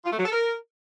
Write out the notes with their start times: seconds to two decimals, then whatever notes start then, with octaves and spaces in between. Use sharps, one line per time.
0.05 F4
0.12 A3
0.18 F#3
0.25 A4
0.32 A#4